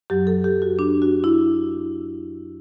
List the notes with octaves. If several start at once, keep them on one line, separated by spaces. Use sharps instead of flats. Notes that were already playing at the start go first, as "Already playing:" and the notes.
F#2 F#3 G4
A4
G4
F#4
D4
F#4
E4